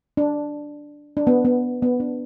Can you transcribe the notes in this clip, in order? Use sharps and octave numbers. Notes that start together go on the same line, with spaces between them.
D4
D4
B3
B3
B3
D4